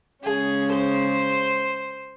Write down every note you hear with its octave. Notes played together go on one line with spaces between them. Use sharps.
C#3 G#3 C#4 G#4
C5